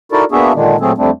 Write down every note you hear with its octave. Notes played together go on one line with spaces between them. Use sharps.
D#4 E4 F#4 A4 A#4 D5
A#3 B3 D4 F#4 G#4 E5
A#2 D3 D#3 G#3 D4
A#2 F#3 A3 C4 G#4 A4
F2 G3 A3 C4 D4